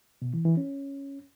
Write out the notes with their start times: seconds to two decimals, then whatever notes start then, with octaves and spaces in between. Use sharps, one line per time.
0.22 B2
0.34 E3
0.45 E3
0.57 C#4